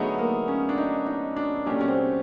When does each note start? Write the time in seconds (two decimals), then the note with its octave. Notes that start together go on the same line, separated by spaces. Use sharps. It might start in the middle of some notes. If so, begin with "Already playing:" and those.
Already playing: D3 F#3 A3 B3 D#4 G#4
0.19 A#3
0.48 C#4
0.69 D4
0.78 D#4
1.06 D#4
1.36 D4
1.66 A#2 F#3 A3 C#4 D4 G4
1.81 C#4
1.88 C4